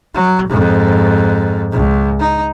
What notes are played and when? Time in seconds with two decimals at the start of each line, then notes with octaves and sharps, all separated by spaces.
0.14 F#3
0.48 F2 G#2
1.73 C#2
2.20 D#4